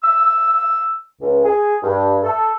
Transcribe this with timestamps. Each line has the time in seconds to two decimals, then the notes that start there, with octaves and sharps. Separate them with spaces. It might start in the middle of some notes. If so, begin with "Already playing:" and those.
0.03 E6
1.21 C#2
1.44 G#4
1.83 G2
2.23 A4